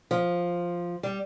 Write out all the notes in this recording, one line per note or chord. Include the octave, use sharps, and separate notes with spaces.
F3
G3